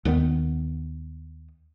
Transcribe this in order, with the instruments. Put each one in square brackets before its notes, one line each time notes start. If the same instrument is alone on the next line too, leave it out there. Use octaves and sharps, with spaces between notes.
[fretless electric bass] D#2 D#3 G3 B3